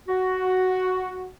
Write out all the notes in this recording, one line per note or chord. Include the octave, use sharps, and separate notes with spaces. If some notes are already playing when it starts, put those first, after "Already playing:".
F#4